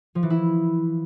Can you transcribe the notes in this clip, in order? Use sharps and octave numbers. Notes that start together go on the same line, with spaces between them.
F3
E3
E4